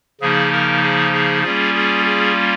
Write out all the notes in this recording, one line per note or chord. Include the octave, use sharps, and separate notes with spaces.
C#3 F3 A#3 D#4 G#4
A#4
G#4
G#4
G3 A#3 C#4 F4 G#4
G#4
G#4